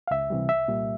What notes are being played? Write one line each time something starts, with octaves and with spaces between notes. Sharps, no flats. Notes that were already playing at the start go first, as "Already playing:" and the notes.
F5
C#2 E5
C3 E3 G3
C2 E5
A#2 G3 A#3